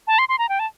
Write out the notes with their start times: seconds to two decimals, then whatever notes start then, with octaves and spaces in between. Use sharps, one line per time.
0.07 A5
0.19 C6
0.29 C6
0.39 A#5
0.49 G5
0.59 A5